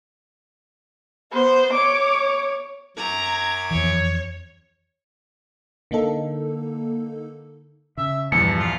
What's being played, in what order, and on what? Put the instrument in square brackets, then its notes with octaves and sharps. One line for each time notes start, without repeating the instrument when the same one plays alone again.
[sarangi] B3 [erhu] C5
[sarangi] C#5 [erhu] D6
[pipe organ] F#2 D6 G#6 [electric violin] A#5
[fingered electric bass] F2 E3 [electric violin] C#5
[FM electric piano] D3 A#3 D#4 A4
[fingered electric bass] C#3 [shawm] E5
[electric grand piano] A#1 E2 [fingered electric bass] G2 G3 [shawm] A5 [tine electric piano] C#7
[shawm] F4